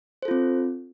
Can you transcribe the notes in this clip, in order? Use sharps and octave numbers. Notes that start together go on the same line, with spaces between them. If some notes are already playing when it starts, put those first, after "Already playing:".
C4 F4 A4 C5